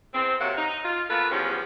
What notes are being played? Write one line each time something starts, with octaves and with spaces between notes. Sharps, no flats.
E2 C4
C3 F#3 A#3 E5 F#5
D#4
F4
A#3 B3 F4 A4 B4
E2 F3 G3 B3 C#4